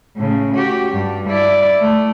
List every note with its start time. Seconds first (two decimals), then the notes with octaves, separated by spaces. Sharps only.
0.16 A2 C#3
0.54 F#4 G4
0.92 G2
1.29 E4 D5
1.81 A3